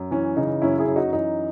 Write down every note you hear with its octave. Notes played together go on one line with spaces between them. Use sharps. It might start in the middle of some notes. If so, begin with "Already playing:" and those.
Already playing: F#2
E3 C#4
C#3 D#4
F#2 C#4 E4
E4 G#4
F#2
D#4 F#4
E3 D#4